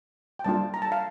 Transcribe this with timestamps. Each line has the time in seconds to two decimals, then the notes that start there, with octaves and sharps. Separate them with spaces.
0.39 G5
0.44 G3 A#3 D4 F4 A5
0.74 A#5
0.82 A5
0.92 F5